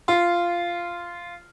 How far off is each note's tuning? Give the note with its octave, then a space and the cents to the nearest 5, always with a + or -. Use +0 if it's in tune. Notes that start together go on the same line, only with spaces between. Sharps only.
F4 -10